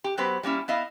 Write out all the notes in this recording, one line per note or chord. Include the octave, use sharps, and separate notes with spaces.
G4
F#3 B3 G4 B4 C5
G3 A#3 C#4 E4
B3 E4 D#5 F5